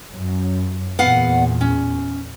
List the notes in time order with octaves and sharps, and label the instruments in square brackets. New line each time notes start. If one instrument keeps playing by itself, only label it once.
[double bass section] F#2
[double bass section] E2 A#2 [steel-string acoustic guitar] B3 F5 F#5
[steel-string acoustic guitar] C#4